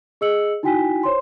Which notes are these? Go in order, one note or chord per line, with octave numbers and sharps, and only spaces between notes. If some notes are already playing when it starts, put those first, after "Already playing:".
G#4 D#5 E6 C#7 F#7
D#4 E4 F#4 G5 G#5 B6
C5 C#5 C6